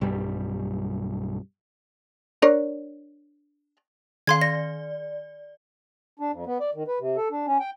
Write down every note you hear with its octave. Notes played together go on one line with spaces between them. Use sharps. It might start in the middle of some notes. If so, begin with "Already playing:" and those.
B1 G2 G3
D4 A#4 C#5
D#3 F5 C6 G#6
D5 A#6
D4
F2
B3
D5
D#3
B4
C3
A4
D4
C#4
G5